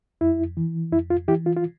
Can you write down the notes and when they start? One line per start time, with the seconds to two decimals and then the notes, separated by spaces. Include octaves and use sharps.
0.21 F2 E4
0.57 E3
0.92 F2 E4
1.10 F4
1.28 E3 E4 G4
1.46 F4
1.57 F4